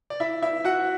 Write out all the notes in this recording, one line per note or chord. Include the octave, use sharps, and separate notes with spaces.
D5
E4 E5
E4 E5
F#4 F#5